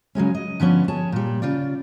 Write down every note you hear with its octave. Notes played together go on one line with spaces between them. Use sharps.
C#3 F#3 G#3 C#4
D#5
D3 F3 B3 C#4
G#4 C#5 A5
A#2 G3
C#3 F4 D5